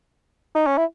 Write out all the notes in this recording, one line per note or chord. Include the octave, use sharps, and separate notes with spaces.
D#4
C#4
E4